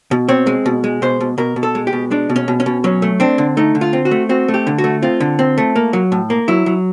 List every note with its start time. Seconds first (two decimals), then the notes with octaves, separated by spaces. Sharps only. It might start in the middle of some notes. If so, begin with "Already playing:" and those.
0.11 B2
0.28 C4 C#5
0.47 G#3
0.66 B2
0.84 G#3
1.02 B2 C5
1.21 B2
1.38 B2 A#4
1.56 B2
1.63 A4
1.75 G#3
1.87 G4
1.93 B2
2.11 G#3 D4
2.30 B2
2.36 C#4
2.48 B2
2.60 C#4
2.66 B2
2.84 F#3 C#4
3.02 A3
3.20 C4 D4
3.38 D3
3.57 A3 D#4
3.75 D3
3.81 F4
3.93 C4
4.05 F#4
4.11 A3
4.29 C4 F#4
4.48 A3
4.54 G4
4.67 D3
4.78 F#4
4.84 A3
5.02 C4 F4
5.20 D3
5.39 C4
5.58 A3
5.76 A#3
5.93 F#3
6.12 A2
6.30 A#3
6.48 F#3 E4
6.66 F#3